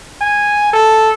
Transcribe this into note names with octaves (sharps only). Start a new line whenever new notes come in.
G#5
A4